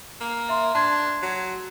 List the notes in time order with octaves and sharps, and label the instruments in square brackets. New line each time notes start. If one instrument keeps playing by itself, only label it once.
[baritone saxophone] A#3
[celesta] E5 C6
[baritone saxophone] D4 [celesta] A5 C6 G#6
[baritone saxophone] F#3